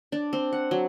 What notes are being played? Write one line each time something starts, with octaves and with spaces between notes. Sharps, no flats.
D4
C4
F#5
F#3